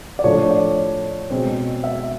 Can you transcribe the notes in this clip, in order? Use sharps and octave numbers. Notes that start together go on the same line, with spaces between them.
D5
A2 F3 A3 D4 C#5
D5
B2 G#3 C4
E5